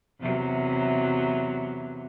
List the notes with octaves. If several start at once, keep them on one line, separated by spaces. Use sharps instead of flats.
E2 C3 F#3